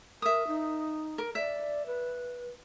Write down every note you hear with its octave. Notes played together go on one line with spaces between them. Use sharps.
A#4 E5 D#6
D#4
A#4
D5 E5
B4